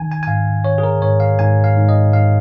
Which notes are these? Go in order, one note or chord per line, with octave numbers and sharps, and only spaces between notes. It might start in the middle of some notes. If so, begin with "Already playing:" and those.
Already playing: D#3 G#5
G#5
G#5
G#2 F5
D#3 C#5
G#4
A#4
G#2 C#5
F5
G#2 G#5
F5
G#2
D#5
G#2 F5